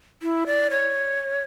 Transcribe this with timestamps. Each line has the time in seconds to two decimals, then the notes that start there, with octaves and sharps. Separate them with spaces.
0.23 E4
0.47 D5
0.70 C#5